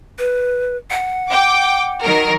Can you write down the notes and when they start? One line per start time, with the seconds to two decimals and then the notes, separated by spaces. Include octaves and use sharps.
0.19 B4
0.91 F#5
1.30 G5 D6
2.02 D#3 F#3 A#4